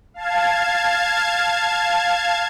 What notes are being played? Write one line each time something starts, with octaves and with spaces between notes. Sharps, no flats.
F5 A5 G#6